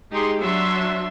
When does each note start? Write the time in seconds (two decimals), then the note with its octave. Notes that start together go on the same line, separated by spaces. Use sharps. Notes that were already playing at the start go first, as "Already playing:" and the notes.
0.11 G#3 D#4 G4 G#4 C6
0.41 F#3 D4 E5 C6